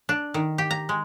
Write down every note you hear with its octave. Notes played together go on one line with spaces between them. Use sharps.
D4
D#3
G4
A#5
G#3